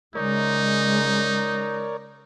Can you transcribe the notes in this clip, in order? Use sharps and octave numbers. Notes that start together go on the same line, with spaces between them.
C#3 G#3 D#4 A#4 C#5 D5